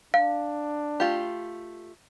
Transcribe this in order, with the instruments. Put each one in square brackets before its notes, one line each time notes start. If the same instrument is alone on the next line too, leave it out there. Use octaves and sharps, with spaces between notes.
[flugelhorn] D4 [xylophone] F5
[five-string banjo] A3 F4 G4